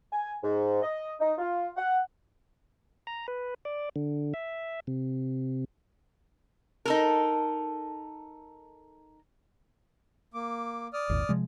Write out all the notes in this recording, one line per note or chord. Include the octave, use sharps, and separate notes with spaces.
G#5
G#2
D#5
D#4
F4
F#5
A#5
B4
D5
D3
E5
C3
D#4 A4 A#4
A#3 D6
D5 D#6 F6
G#1 D#2 A#2
C3 F3 G#3